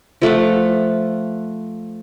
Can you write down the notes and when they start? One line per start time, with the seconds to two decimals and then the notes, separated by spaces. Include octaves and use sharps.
0.22 F3 A3 F5 F#5